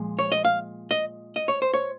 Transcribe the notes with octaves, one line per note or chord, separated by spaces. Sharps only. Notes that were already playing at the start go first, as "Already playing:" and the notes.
Already playing: A#2 F3 G#3
C#5
D#5
F5
D#5
D#5
C#5
C5
C#5